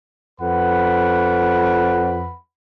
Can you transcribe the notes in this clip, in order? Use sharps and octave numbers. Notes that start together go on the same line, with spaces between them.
F2 B4 F#5 B5